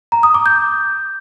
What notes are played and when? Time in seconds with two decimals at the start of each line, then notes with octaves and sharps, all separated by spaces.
0.12 A#5
0.23 D#6
0.34 D6
0.46 G6